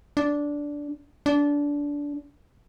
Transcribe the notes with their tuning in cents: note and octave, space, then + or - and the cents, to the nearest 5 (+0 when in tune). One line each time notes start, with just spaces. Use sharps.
D4 -10
D4 -20